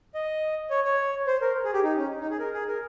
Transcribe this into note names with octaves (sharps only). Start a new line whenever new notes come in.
D#5
C#5
C#5
C5
A#4
G#4
G4
D#4
C#4
D#4
G#4
A#4
G#4
A#4